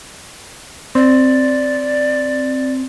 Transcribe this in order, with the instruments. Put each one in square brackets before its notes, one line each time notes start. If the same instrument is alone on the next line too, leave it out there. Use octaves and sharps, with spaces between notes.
[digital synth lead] C4 [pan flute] D5